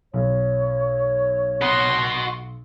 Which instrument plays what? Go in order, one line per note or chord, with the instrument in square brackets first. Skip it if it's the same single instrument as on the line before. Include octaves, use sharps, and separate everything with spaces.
[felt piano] B1 [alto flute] C#5
[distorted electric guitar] F#4 D#5 [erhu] C6